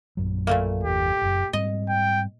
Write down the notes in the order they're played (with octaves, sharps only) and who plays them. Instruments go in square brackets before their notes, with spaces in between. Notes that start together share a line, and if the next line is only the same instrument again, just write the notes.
[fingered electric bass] A#1 F#2 F#3
[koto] A#2 A3 A#3
[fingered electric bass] G1 E2 [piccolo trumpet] G4
[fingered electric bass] F#1 F#2
[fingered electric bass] G#2 G3 C4 [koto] D#5
[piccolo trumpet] G5